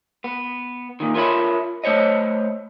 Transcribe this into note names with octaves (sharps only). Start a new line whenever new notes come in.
B3
A#2 D#3
F4 A#4 C#5 E5 B5
A3 C5 C#5 D#5